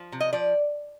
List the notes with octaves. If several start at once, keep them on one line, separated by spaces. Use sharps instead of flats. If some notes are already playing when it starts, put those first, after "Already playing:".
Already playing: F3
C3
D#5
F3 D5